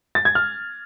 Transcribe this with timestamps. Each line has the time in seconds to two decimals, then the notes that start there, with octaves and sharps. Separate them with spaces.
0.15 A6
0.25 G#6
0.35 F6